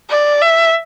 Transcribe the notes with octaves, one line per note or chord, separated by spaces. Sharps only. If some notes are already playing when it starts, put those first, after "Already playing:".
D5
E5